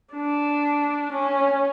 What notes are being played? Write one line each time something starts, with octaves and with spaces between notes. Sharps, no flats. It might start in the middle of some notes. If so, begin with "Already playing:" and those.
D4
C#4